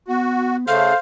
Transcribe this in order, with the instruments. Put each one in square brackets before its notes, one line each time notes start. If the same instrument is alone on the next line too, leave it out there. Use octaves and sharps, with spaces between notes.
[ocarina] B3 [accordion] F#4
[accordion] C#3 A3 [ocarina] A4 [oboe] C5 [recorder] F5